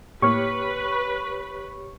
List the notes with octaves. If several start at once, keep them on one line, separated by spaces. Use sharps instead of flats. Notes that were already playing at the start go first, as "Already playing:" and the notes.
A2 A#3 E4 G4 B4 C#5 C#6 F6